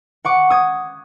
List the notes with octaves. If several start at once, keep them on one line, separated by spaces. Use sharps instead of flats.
F#5 C#6 D6
D#6 G#6